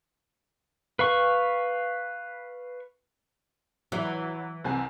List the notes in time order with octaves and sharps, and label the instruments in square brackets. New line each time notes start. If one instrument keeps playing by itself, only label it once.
[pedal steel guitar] B4 F5 C#6
[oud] E3 [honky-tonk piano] F#3
[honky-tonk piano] C2 C4 G#5